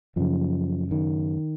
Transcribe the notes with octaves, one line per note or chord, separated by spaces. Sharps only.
F#2 C#3 F3
D#3